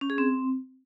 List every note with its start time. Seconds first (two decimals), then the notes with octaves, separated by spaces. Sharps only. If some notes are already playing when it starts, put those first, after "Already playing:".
0.01 C#4
0.10 G#4
0.18 C4